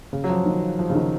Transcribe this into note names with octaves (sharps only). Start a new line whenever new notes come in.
C#3
F#3
F3
D#3
F3
C#3
D#3